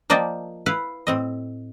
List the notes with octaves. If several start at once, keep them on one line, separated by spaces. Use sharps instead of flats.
F3 A#3 D5 D#5 G5 A5
E4 B4 F5
A2 C4 D#5